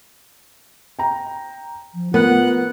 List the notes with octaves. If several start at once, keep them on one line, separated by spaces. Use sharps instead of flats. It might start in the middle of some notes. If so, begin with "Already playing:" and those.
G5 A#5
F3
B3 F4 A#4 F#5